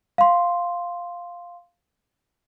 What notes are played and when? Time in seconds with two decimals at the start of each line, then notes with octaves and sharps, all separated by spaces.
0.18 F5 C6